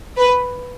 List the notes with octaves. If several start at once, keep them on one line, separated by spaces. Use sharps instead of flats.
B4